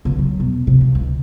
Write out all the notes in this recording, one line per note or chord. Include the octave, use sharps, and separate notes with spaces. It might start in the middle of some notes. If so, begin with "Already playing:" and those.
C#2 D3
F#3
E1
C3
C#3 F3
C#2